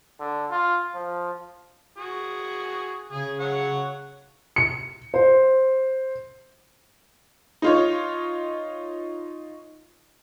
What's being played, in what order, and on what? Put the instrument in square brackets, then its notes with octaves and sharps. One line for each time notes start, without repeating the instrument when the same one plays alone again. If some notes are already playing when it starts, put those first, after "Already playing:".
[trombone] D3
F4
F3
[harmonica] F#4 G#4
[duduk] C#3 [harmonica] G#4
[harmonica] C#5 F#5
[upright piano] C#7
C5
[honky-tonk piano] D#4 F4 C#5